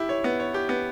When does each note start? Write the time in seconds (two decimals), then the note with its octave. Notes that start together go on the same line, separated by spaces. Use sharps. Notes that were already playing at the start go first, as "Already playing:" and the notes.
Already playing: E4 G4
0.09 C#5
0.24 B3
0.39 C#5
0.54 G4
0.69 B3